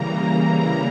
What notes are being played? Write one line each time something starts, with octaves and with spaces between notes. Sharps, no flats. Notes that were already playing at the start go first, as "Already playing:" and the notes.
Already playing: C#3 E3 G3 A#3 A#5
A#5